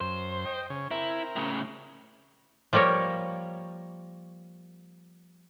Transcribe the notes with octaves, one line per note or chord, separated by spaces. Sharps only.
F#2 C5
D#5 G5
C#3 C#5
C4 E4 A#4 A#5
A2 C#3
F3 G3 A#3 A#4 C#5